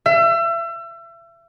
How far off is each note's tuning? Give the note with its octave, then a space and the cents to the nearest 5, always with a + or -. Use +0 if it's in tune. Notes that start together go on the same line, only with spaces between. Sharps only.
E5 +35